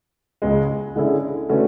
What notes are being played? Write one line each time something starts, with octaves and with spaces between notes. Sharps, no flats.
C#2 C#3 G#3
D3 G#3 C#4 E4 G#4
D3 A3 C#4 F#4 B4